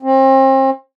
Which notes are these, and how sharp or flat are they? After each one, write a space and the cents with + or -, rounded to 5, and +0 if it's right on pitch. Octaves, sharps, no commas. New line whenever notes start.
C4 +35